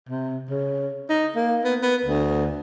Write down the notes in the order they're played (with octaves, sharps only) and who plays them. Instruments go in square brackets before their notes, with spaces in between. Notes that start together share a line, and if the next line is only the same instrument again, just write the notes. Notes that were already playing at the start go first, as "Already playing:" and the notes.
[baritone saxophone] C3
C#3
D#4
A#3
B3
B3
D2